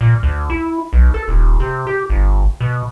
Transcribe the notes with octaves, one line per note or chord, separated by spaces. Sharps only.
A#2
D2
E4
B1
A4
D#1
C3
G4
G1
B2